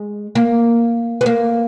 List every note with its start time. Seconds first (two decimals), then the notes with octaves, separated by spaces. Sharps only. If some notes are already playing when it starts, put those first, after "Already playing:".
Already playing: G#3
0.35 A#3
1.21 B3
1.26 A#3